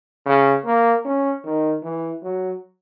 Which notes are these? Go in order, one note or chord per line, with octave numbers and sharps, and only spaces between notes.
C#3
A#3
C#4
D#3
E3
F#3